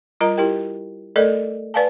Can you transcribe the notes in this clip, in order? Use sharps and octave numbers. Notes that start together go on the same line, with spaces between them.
G3 F4 A#4 D#5 A#5
E4 G4 A#4 G5
A3 A4 A#4 D5 D#5
B4 D5 F5 G#5 A5